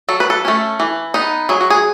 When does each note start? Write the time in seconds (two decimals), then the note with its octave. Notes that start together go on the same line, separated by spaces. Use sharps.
0.09 F#3 A4
0.20 B4
0.30 A4
0.45 A3 C#4
0.80 E3
1.14 B3 D#4
1.49 F#3 G#4
1.61 F#4
1.70 G#4